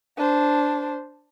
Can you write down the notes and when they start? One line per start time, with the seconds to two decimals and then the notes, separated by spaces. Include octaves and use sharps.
0.17 D4 C5